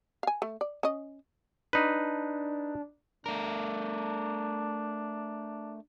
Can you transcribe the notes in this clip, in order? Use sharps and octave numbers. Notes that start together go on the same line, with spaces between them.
F5 G#5
A3
D5
C#4 D#5
D4 D#4 B4
A3 D4 A#4